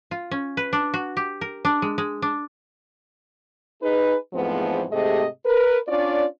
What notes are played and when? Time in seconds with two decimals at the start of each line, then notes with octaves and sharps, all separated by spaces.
0.11 F4
0.31 C#4
0.57 B4
0.73 D4
0.94 F#4
1.17 G4
1.41 A#4
1.65 D4
1.82 G#3
1.98 G#3
2.22 D4
3.82 D#4 G#4 B4
4.34 E2 G#2 F3 A3 B3 C4
4.92 G#2 C3 A3 G4 G#4 D#5
5.45 A#4 B4
5.87 C#4 D4 F4 C#5 D5